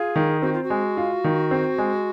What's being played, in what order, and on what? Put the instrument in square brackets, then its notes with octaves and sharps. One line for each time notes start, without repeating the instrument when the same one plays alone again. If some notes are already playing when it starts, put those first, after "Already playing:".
Already playing: [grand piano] F4 [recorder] G#4
[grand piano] D#3
[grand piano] C4 [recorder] F#4
[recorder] F4
F#4
[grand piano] G#3
F4
D#3
C4
G#3